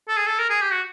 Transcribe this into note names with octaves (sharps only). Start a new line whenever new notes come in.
A4
G#4
A4
A#4
G#4
G4
F#4